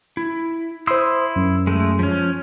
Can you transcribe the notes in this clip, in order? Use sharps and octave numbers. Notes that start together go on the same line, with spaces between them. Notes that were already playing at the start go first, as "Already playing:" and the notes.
E4
E4 C5 C6 D#6 E6
F#2
G#3 A3
F3 C#4